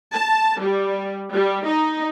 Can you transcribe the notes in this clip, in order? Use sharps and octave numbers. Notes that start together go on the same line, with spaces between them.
A5
G3
G3
D#4